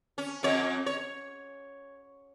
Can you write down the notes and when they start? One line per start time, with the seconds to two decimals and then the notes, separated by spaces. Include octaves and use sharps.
0.18 C#4
0.43 F2 C#5
0.86 C#5